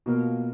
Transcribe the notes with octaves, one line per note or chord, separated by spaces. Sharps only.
B2 A#3 F4 A#4